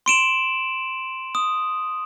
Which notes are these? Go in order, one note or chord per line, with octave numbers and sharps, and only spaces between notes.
C6 D7 E7 F#7
D#6